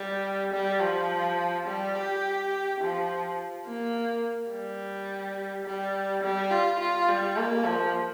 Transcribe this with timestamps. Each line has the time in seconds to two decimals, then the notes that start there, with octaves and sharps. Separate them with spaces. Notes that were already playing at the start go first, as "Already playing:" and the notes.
Already playing: G3
0.53 G3
0.80 F3
1.67 G3
1.95 G4
2.81 F3
3.66 A#3
4.51 G3
5.65 G3
6.23 G3
6.51 F4
6.80 F4
7.09 G3
7.37 A#3
7.65 F3